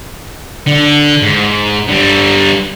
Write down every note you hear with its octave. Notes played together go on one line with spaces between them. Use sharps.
D3
G#2
D3 G3